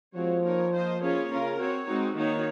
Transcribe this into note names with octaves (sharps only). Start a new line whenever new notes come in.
F3 G#3 C4 F#4 C#5
A#3 D#4 A#4 C#5
A#3 F4 C5 D#5
A#3 C#4 F4 G#4 C#5
C#3 C#4 F4 A#4
C4 F#4 C#5
G#3 C4 D#4 F#4
D#3 A#3 D#4 F#4 C#5